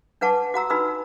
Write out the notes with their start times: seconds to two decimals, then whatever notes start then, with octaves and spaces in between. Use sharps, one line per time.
0.21 D4 B4 F#5 A5 C#6 D6
0.54 F#4 F#5 A#5 E6
0.70 D4 D#4 F#4 B4 B5 E6